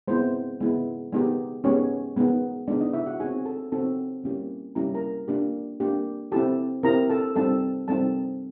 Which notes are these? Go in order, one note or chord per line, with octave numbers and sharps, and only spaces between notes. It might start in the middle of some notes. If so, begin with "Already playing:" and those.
G#3 B3 C4 E4 C5
G#3 B3 E4
G#3 B3 D#4 G4
G#3 B3 C#4 D#4 G4 C#5
G#3 B3 D#4
G#3 B3 D4 D#4 D5
D#4 D#5
E4 E5
F#4 F#5
C4 D#4 F#4 G#4 G#5
A4 A5
C4 D#4 F#4 A4 A5
G3 A#3 C#4 E4 G4
G3 A#3 C#4 E4 G4 A#5
A#4 A#5
A#3 D4 G4
A#3 D4 G4
C4 E4 G4 A4 A5
C4 E4 G4 A#4 A#5
A4 A5
G3 C4 D#4 A4 A5
G3 C4 D#4 A4 A5